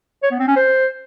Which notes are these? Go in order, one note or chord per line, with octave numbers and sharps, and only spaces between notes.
C#5
B3
C4
C#4
C5